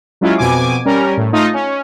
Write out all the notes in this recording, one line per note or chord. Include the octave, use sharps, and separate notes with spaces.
F#3 G#3 C#4 E4 F4
F2 B2 G#5 D6
G3 C#4 A#4
A2
A3 D#4 F4 D#5
C#4